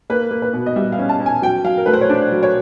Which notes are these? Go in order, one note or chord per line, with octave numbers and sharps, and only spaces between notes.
A#3 B4
A#3
B4
B2
D#5
G3 E5
F5
C#4
A5
C#4
G#5
F#3 G5
F#3 F5
A#4
A3 B4
C5
C#5
D4 D5
F#3
C#5